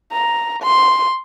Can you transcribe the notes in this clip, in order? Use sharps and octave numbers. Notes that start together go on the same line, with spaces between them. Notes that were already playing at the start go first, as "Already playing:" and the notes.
A#5
C6